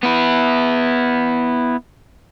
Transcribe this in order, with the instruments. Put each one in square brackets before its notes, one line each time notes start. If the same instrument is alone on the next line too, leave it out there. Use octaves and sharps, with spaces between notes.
[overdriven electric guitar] B3 E4